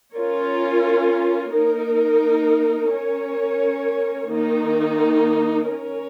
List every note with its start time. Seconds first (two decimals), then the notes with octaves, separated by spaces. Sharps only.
0.14 C#4 F4 A#4 C#5
1.52 A#3 D#4 A#4
2.90 C#4 A#4 C#5
4.29 D#3 A#3 D#4
5.68 C#4 A#4 C#5